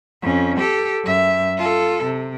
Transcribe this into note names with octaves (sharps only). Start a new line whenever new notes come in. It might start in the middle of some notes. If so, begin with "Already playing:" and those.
F2 C#4
G4 A4
F#2 E5
F4 A4
C3